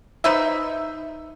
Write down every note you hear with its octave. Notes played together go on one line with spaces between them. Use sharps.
D#4 B4 C5 E5